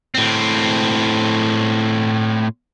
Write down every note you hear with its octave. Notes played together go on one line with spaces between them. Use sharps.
A2 C4